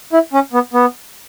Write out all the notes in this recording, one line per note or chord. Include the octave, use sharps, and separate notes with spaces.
E4
C#4
B3
B3